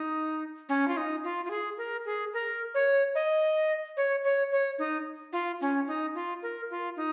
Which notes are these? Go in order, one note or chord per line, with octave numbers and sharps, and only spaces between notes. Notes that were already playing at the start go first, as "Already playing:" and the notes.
Already playing: D#4
C#4
F4
D#4
F4
F4
G#4
A#4
G#4
A#4
C#5
D#5
C#5
C#5
C#5
D#4
F4
C#4
D#4
F4
A#4
F4
D#4